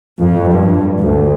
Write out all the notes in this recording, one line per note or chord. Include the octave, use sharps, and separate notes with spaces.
F2
G2
D2